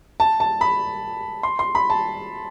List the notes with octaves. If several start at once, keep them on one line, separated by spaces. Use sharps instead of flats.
A5
A5
B5
C6
C6
B5
A5